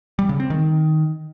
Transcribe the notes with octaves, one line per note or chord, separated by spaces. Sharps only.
G3
C#3
C4
D#3